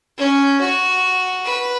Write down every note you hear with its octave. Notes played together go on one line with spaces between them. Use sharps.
C#4
F#4
B4